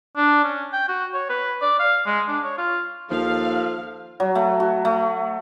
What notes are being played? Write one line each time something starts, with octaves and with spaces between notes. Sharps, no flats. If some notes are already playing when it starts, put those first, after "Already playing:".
D4
C#4
G5
F#4
C#5
B4
D5
F5
G#3
D4
C#5
F4
D#2 F3 A4 F5
F#3
A3
F#4
A3